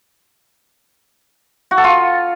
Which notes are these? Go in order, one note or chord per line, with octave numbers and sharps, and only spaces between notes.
F#4
A4
F4